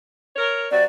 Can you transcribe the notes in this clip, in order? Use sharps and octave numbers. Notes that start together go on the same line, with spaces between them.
A#4 C#5
C3 F#3 C4 D5